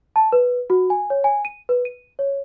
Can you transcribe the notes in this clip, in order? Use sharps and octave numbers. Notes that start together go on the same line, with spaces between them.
A5
B4
F#4
G#5
C#5
G#5
D#7
B4
D#7
C#5